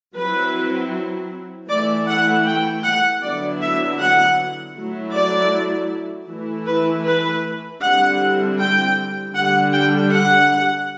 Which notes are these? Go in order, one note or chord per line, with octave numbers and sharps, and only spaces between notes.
F#3 C4 E4 B4
E3 A3 E4 D5
F#5
G5
F#5
D3 F#3 B3 E4 D5
E5
F#5
F#3 A3 E4
D5
E3 A3 E4
B4
B4
D3 G3 C4 E4 F#5
G5
D3 G3 D4 F#5
G5
F#5